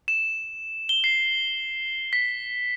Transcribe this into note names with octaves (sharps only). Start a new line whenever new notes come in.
E7
G7
C7
B6